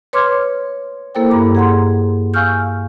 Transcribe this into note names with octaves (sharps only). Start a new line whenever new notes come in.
B4 C#5 C6 D6 F6 G#6
A#3 E4 A4 A#4 C5 G5
G2 A#5 D6
G#4 F#5 A#5 C6
F5 G#5 C#6 E6 F6 G6